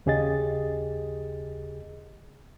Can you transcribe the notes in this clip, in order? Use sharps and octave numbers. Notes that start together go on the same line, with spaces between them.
D#2 C#3 G4 G#4 D#5 A6